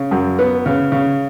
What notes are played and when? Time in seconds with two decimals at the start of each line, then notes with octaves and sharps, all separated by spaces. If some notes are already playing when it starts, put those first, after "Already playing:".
Already playing: C#3
0.11 F#2
0.39 B3
0.66 C#3
0.92 C#3